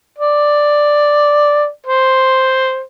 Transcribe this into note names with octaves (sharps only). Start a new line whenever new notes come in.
D5
C5